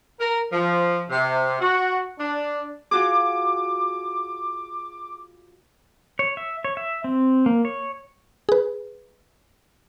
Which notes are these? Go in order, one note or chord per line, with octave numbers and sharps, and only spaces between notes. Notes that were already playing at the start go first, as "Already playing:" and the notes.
A#4
F3
C3
F#4
D4
F4 F#4 G#4 D6
C#5
E5
C#5
E5
C4
A#3
C#5
G#4 B4